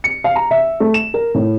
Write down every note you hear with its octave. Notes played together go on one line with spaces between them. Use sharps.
C#7
F5
A#5
E5
A3
E7
A#4
A2